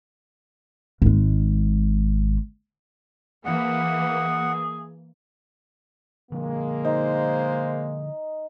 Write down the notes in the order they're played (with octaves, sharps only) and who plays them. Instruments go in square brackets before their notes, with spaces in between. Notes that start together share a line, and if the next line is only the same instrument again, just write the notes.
[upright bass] G#1 G#3
[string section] E3 A#3 [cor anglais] G#4 [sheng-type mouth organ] F#5
[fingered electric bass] D3 F3 [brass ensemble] G#3 A#3
[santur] D#4 [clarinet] C5